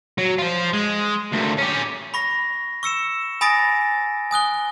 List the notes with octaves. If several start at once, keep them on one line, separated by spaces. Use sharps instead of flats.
F#3
F4 C5
G#3
D2 A#2
C#4 G4
B5 C#6 A#6
C#6 E6 C#7 E7
G#5 B5 D#6 A6 A#6 D7
G#5 D#6 F#6 G7